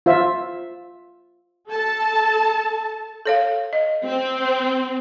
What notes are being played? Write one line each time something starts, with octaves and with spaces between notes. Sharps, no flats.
F4 C5 E5
A4 A5
A4 C#5 F5
D#5
C4